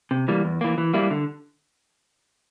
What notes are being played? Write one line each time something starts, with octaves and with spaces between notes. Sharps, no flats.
C3
E3 G3 A#3
E2
E3 A#3
E3
G3 A#3 E4
D3